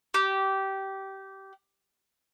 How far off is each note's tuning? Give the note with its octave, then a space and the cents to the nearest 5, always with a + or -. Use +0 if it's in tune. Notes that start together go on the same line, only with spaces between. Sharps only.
G4 -20